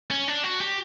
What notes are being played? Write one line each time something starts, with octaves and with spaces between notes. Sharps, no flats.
C#4
D4
F#4
G4